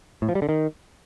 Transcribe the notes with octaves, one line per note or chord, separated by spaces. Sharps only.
A2
F3
G3
D3
D#3